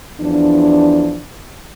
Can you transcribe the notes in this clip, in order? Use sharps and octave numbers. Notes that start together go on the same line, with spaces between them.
E2 F3 D4